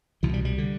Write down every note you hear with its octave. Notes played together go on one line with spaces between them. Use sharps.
C2 B2 E3
G3
G3
D3